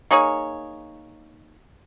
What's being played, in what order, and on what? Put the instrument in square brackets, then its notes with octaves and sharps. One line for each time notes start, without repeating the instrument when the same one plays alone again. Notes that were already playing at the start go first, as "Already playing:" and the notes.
[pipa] A#3 D#4 G#4 C#5